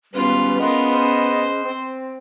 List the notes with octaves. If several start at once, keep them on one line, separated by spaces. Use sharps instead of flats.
G#1 F#2 G3 B3 C#4 F4 B4
B3 F4 G#4 A#4 B4 D#5
C5
C4